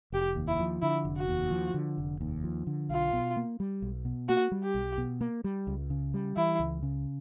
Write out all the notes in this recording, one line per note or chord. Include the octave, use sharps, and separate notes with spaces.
F1 G4
D#2
E4
F3
D3 E4
F1
F#4
D#2
F3
D3
F1
D#2
F3
D3
B1 F4
B2
A#3
G3
B1
B2
A#3 F#4
G3
G4
B1
B2
A#3
G3
C#2
C#3
G3
E3 E4
C#2
C#3